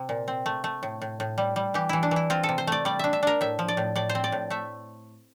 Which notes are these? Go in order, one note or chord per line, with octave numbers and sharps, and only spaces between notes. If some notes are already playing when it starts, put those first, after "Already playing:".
Already playing: C3
A#2
C4
A3
A3
A2
A2
A2
G3
G3
E3 G4
E3 E4
D4
E3 E4
C4 F4
A4
C3
C5
A3 D5
G3 D5
D4 E5
E5
D4 A#4
A2 E5
F3
D5
A2
A2 D5
C5
C4
D5
A2
A3 E5